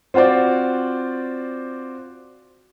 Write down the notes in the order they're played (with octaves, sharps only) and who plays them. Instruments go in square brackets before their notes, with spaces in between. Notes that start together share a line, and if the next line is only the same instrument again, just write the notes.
[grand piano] C4 F4 F#4 C5 D5